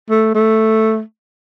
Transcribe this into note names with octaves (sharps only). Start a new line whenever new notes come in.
A3
A3